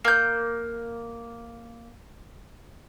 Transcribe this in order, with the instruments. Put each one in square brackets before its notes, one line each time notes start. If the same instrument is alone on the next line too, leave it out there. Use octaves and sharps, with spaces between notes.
[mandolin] A#3 G6